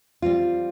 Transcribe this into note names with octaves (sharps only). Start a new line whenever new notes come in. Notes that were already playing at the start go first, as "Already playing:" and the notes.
G3 C4 F4